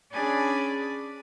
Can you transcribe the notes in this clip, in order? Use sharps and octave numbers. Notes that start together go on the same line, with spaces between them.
C#4 D4 G#4 D5 G#5 B5